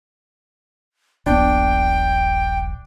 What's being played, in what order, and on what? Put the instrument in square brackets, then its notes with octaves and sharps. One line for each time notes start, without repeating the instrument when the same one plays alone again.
[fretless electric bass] D#1 A#1 B3 [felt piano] D4 [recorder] G5